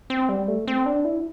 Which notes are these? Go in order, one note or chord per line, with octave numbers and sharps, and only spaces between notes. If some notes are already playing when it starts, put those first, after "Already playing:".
C4
G3
A3
C4
D4
E4